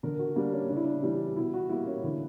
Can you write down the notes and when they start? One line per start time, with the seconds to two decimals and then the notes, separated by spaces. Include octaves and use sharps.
0.03 D3 A#4
0.19 F#4
0.36 G3 A#3 D4
0.52 C#4
0.69 C#3 D4
0.76 E4
0.85 D4
1.03 E3 G3
1.36 B2 E4
1.54 F#4
1.69 G3 A#3 E4
1.87 C#4
2.03 D3 E4